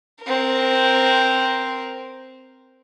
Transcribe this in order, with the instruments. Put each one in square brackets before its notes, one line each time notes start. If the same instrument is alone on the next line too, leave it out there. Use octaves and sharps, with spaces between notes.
[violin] C4 A#4